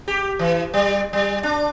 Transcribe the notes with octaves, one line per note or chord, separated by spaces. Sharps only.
G4
E3
G3
G3
D4